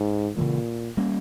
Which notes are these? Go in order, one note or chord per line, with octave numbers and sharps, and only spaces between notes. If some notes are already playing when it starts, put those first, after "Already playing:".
Already playing: G#2
A#2 C#3 E3 G#3
G3 A#3 C#4